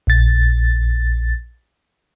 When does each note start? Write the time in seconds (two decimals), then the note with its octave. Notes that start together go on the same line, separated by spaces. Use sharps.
0.07 A#1 A6